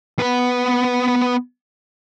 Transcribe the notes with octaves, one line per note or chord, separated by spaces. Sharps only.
B3 B4